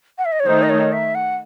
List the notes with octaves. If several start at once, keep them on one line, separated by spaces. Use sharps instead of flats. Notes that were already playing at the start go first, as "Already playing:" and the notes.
F#5
E5
D#5
C#5
D#3 A3 D#4 C5
D#5
C#5
E5
F#5